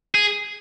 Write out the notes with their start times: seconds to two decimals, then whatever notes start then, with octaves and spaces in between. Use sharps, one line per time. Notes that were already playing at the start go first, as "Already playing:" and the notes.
0.15 G#4